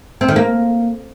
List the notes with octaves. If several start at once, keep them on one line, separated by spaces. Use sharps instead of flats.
C4
D#3
A#3